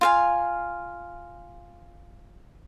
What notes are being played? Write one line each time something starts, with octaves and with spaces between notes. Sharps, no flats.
F4 F5 G#5